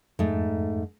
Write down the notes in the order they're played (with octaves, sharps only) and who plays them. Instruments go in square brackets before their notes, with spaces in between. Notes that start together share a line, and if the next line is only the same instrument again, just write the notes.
[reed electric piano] F2 [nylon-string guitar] G#2 A3